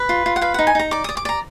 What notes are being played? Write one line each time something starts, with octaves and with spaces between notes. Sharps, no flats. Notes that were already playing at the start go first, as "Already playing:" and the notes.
Already playing: B4
F4
F4
F#5
B4 F5
D#4 F#5
G#5
D#4 A#5
D5 D6
D5 D#6
D6
D5 A#5